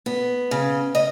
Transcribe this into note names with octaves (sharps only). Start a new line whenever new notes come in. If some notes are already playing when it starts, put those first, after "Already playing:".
B3
C#3
D#5